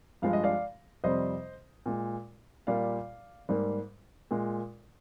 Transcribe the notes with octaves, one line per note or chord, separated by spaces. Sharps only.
G2 F3 G#3 F5
D#5
D5 F5
F2 C3 G3 C5 D#5
A#2 G#3
A#2 G3 A#3 D5 F5
G#2 G3 A#3
A#2 G#3